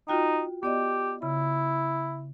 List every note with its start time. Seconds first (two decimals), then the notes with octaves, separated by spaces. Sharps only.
0.08 D#4 F4 F#4 G5
0.63 B3 G4 D5 D#5
1.22 C#3 E4 B5